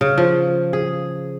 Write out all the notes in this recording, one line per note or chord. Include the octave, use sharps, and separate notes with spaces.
C#3
F3
G#4